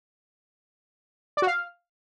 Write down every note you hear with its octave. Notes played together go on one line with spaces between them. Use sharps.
D5
F#4
F5